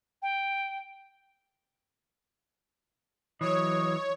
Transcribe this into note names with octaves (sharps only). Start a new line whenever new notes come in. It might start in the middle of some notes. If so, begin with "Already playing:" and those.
G5
E3 F#3 C#5 D#5